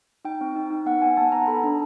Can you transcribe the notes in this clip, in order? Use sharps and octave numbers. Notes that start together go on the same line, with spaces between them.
D#4 G5
C4
D#4
D#4
B3 F#5
B3 G#5
B3 A5
B3 A#5
A4 B5
D4